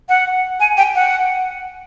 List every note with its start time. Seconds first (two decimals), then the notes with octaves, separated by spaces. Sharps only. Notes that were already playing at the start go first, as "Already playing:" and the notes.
0.09 F#5
0.60 G#5
0.77 G5
0.95 F#5